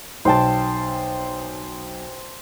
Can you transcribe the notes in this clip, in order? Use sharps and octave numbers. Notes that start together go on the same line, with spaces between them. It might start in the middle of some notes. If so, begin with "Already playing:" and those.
B1 C5 G5 A5